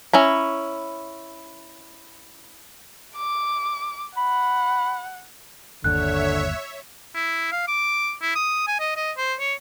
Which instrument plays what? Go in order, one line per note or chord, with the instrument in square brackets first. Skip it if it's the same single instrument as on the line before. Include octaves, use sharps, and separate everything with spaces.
[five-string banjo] C#4 E4 A#5
[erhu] D6
[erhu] F#5 [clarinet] B5
[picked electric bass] G1 D#2 [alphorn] D3 [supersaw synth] C#5 E5 [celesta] F#6
[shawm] E4
F5
D6
E4
D#6
G#5
D#5
D#5
C5
C#5